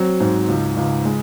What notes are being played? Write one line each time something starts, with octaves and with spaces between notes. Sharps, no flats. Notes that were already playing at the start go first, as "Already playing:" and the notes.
Already playing: F#3 C4
G#2
C#2
C#2
G#3